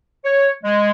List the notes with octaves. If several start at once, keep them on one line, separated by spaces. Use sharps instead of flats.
C#5
G#3